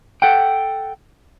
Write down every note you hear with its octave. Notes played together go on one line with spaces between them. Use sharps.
A4 F#5 G5